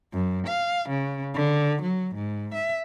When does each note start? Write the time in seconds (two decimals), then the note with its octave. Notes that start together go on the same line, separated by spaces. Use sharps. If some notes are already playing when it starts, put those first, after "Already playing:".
0.13 F#2
0.47 F5
0.89 C#3
1.34 D3
1.82 F#3
2.15 G#2
2.54 E5